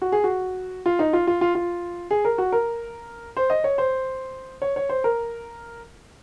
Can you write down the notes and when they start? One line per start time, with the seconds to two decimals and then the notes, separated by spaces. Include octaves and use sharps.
0.02 F#4
0.12 G#4
0.24 F#4
0.86 F4
0.99 D#4
1.13 F4
1.27 F4
1.41 F4
1.55 F4
2.11 G#4
2.25 A#4
2.38 F#4
2.52 A#4
3.37 C5
3.50 D#5
3.64 C#5
3.78 C5
4.62 C#5
4.76 C#5
4.89 C5
5.04 A#4